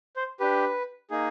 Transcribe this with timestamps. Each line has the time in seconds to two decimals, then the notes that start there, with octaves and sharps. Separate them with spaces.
0.16 C5
0.40 D4 G4 B4
1.10 A#3 D#4 G#4